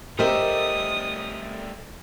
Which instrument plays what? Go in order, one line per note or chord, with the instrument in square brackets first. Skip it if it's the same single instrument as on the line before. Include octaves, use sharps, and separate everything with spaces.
[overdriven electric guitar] G3 A3 [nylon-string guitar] G4 C5 [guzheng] A#4 D#5 E5 [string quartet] D#6